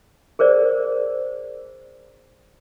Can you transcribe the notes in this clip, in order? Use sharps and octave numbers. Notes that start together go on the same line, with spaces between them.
G#4 A#4 C5 D5